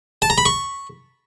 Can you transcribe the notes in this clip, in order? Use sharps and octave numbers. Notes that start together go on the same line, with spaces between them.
A5
A#5
B5
C#6